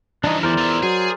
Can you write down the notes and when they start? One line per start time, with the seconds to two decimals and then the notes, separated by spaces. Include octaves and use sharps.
0.24 G2 E3 F3 D4 D#4
0.43 E2 A#4 C5 D5
0.58 F4 E5
0.83 F#3 G#4